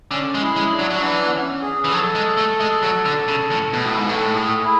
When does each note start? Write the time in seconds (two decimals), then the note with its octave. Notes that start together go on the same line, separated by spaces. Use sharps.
0.11 D3 C#4
0.35 G#3
0.42 E4
0.56 G#3
0.72 D4
0.79 F#3
0.90 F#3
1.02 E3 D4
1.26 B3
1.32 C#4
1.62 G#4
1.84 E3
1.92 F#3 A4
2.15 G#3
2.37 A3
2.60 G#3
2.83 F#3
3.06 D3
3.28 C#3
3.51 A2
3.73 B2 B4
3.85 A2
3.97 G#2
4.03 A4
4.09 A2
4.34 G#4
4.64 E4